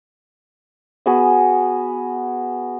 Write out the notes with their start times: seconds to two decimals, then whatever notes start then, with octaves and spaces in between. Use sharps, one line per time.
1.06 B3 F#4 G#4 E6